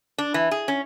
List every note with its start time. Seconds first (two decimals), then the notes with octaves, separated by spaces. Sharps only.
0.18 D4
0.34 E3
0.51 G#4
0.68 C#4